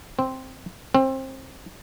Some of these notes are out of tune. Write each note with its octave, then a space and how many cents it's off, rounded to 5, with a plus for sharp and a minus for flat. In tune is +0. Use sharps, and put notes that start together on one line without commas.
C4 +0
C4 +25